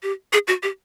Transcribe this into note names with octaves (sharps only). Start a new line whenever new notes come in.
G4
G#4
F#4
G4